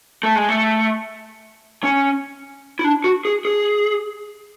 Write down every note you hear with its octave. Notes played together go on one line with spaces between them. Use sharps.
A3
G#3
A3
C#4
E4
D4
F#4
G#4
G#4